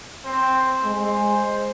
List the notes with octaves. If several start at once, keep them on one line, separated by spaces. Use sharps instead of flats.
C4 C5
G#3 C5